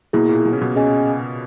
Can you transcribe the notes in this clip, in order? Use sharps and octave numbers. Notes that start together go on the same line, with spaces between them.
B2 A#3 E4 G#4
A#2
B2
C#3
B2
C#4 G#4 D#5 G#5